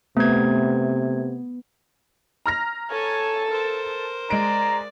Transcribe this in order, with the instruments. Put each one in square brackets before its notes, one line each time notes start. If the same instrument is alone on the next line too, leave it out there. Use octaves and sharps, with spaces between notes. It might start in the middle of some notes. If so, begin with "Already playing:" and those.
[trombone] C3 [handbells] A3 G#6 [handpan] B3
[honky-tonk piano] A#5 F6 A#6
[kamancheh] A4 A5 [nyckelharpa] C#5 G#5
[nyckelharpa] A#4 C5
[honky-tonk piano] G#3 D7 [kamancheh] D5 [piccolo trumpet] A#5